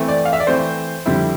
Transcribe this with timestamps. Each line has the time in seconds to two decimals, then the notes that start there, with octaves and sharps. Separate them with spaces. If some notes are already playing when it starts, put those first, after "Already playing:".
Already playing: E3 A3 C4
0.08 D5
0.25 F5
0.33 E5
0.40 D5
0.47 E3 A3 C4 C5
1.06 F2 D3 G3 C4 E4